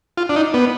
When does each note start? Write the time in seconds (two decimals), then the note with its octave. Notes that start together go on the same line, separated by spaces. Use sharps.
0.17 F4
0.29 D4
0.36 D#4
0.54 B3